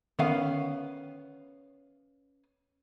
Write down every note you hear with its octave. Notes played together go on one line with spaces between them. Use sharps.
D3 D#3 B3 C#4 B4 F5